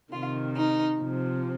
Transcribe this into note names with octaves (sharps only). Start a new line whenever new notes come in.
C3 D#3 F4
D#4
C3 F3